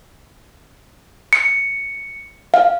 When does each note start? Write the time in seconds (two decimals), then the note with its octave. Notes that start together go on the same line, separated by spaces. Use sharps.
1.33 C#7
2.54 F5